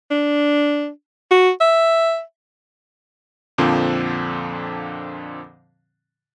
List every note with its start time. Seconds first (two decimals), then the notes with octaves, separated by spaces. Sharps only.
0.11 D4
1.31 F#4
1.61 E5
3.58 F2 A#2 D3 F3 C4